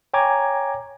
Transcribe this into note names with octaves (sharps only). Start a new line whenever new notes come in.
C#5 G5 G#5 A#5 D6 G#6